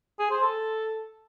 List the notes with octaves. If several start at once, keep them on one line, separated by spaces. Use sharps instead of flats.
G#4
C5
A4